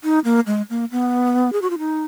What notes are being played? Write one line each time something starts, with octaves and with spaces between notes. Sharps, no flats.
D#4
A#3
G#3
A#3
B3
G#4
F#4
F4
D#4